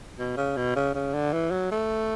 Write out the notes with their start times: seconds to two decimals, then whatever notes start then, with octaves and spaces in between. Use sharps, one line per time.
0.19 B2
0.37 C#3
0.57 B2
0.76 C#3
0.94 C#3
1.14 D3
1.33 E3
1.51 F#3
1.71 A3